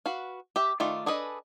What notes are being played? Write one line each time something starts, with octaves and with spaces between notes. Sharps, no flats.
F#4 B4 F5
G4 E5
D#3 A3 F4 D5
D4 G#4 A4 B4 D#5